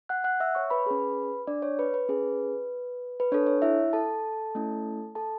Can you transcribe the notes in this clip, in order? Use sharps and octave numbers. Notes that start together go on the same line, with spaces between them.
F#5 F#6
F#5 F#6
E5 E6
C#5 C#6
B4 B5
C#4 G#4
D4 D5
C#5
B4
B4
C#4 G#4
B4
D4 A4 C#5
C#5
E4 E5
A4 A5
A3 C#4 E4
A4 A5